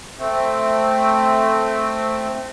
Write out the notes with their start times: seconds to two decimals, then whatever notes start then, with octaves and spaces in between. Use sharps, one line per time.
0.18 A3 C4